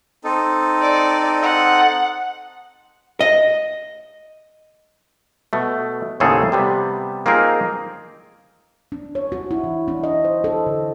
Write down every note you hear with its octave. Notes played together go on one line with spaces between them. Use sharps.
C4 D#4 A4
D5
F#5
D#5
B2 A3
D#2 A2 C#3 C4 G#4 A4
C3 G3 B3
A#3 C4 D#4 F4 G#4 A#4
D4
C#5
F#4
E4
E3
D4
D#5
C5
A4
D3